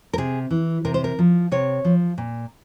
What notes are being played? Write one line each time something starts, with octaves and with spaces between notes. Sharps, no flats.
A#4
C3 G#4
E3
C3 A#4
C5
A#4
F3
C3 C#5
F3
A#2